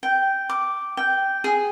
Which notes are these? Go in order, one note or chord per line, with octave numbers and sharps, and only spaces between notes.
G5
D6
G5
G#4